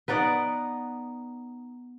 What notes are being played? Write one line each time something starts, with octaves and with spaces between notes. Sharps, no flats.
B3 D#4 D5 F#5